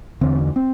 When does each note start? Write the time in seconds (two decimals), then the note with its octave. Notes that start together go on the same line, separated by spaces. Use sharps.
0.21 E2 D3 C4
0.56 C4